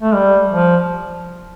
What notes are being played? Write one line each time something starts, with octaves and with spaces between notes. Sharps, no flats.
A3
G3
F3